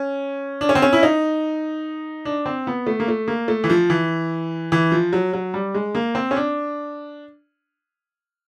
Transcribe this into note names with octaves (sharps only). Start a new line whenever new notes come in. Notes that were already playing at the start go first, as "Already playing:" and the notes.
Already playing: C#4
D4
C#4
C4
C#4
E4
D#4
D4
C4
B3
A3
A#3
A3
A#3
A3
E3
F3
E3
E3
F3
F#3
F#3
G3
G#3
A#3
C4
C#4
D4